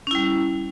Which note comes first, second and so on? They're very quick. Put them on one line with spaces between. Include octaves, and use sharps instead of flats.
C#4 E4 G3